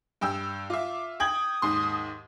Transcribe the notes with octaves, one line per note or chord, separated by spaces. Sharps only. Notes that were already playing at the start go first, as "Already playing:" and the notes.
G2 G5 E6
F4 E5 D6
G5 D#6 G#6 F#7
D#2 G#2 C6